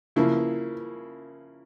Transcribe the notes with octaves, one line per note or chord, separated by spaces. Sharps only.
C#3 F3 A#3 E4